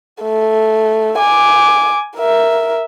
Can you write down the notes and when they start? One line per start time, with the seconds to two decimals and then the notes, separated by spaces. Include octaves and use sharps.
0.23 A3
1.18 G#5 D6
2.17 A#4 E5